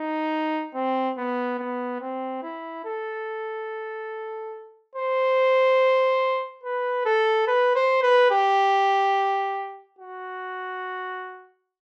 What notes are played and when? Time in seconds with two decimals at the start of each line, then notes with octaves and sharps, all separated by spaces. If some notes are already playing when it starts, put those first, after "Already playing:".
Already playing: D#4
0.74 C4
1.18 B3
1.59 B3
2.00 C4
2.43 E4
2.85 A4
4.95 C5
6.64 B4
7.05 A4
7.47 B4
7.76 C5
8.03 B4
8.31 G4
9.99 F#4